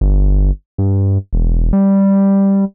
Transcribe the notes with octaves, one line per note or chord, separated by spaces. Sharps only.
G1
G2
E1
G3